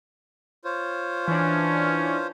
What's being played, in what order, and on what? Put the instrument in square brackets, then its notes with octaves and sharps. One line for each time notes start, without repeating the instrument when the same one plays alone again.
[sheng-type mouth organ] F4 C5 C#5
[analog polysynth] E3 D4 [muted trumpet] C#4